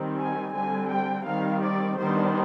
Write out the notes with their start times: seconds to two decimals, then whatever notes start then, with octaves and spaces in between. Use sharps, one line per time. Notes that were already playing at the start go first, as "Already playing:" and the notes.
Already playing: D#3 G3 C4
0.17 G#5
0.53 D3 G3 C4 G#5
0.90 G5
1.26 D#3 G3 C4 F5
1.63 D5
1.98 D#3 G3 B3 D4 C5